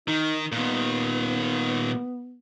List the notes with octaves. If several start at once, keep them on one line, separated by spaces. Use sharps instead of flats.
D#3 D#4
A#2 D#3 B3